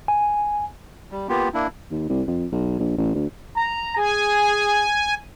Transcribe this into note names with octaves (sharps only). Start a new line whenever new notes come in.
G#5
G3
A#3 B3 F4 G4
A#3 D4 E4
D#2
C2
F2
B1
A#1
A1
D2
A#5
G#4 G#5